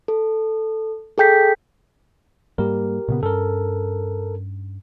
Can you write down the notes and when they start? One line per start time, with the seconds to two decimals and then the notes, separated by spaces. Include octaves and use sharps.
0.08 A4
1.18 G#4 A4 G5 G6 B6
2.58 G#2 G3 A#3 G4 A#4
3.08 A#2 C#3 B3
3.23 G2 C#4 A4 A#4